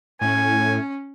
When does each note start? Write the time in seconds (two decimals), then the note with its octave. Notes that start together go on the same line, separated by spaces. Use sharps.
0.21 A2 C#4 G#5